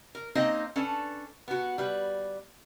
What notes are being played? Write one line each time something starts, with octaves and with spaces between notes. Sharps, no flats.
A#4
A#3 C4 C#4 D#4 C5 D#5
C#4 D4 A4 B4
B3 F#4
G3 B4